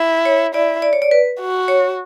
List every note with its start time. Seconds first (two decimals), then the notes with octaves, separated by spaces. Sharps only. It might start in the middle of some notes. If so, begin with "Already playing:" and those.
Already playing: E4
0.25 C#5
0.54 E4 D5
0.82 D5
0.93 C#5
1.02 D5
1.11 B4
1.40 F#4
1.68 C#5